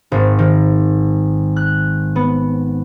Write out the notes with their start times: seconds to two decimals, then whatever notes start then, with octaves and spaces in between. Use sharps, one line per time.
0.12 G#1
0.39 D#3
1.56 F#6
2.16 B3